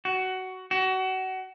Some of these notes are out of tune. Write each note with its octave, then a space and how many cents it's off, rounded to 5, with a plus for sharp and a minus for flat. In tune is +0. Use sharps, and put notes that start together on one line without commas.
F#4 +15
F#4 +30